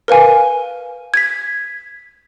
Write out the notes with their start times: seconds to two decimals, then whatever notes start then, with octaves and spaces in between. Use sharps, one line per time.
0.08 A#4 B4 F5 G#5
1.14 G#6 B6